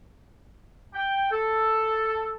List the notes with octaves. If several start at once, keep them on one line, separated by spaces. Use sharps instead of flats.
G5
A4